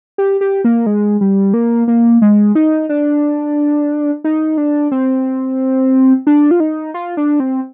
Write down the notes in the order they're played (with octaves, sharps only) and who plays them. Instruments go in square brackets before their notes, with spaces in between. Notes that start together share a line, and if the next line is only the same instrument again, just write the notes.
[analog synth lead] G4
G4
A#3
G#3
G3
A#3
A#3
G#3
D#4
D4
D#4
D4
C4
D4
F4
D#4
F4
D4
C4